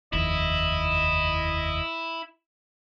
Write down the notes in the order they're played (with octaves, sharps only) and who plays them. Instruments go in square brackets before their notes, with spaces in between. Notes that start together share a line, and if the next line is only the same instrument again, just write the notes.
[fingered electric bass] F1 D#2 [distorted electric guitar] E4 [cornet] D#5